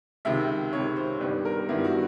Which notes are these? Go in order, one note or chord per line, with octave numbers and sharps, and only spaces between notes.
C#2 C3 D#3 E5
C#2 C3 D#3 C#5
C5
G2 D#3 G3 B3 B4
A#4
G2 D#3 G3 B3 E4
F#4